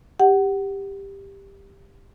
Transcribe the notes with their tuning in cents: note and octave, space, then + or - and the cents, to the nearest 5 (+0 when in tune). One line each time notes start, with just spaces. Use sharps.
G4 +10 F#5 +20